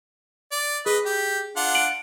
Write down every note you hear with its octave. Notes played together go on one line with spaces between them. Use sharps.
D5
G#4 B4 D#5
G4
D4 F4 F#5
D7 F#7